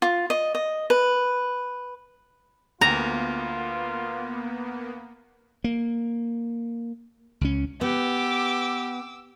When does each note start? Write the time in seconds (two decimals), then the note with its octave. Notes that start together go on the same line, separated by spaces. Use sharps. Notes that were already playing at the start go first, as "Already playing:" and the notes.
0.02 F4
0.30 D#5
0.55 D#5
0.90 B4
2.81 D2 A#3 B3 F4 A#5
5.64 A#3
7.41 C#2 C#4
7.81 B3 G4 D6 E6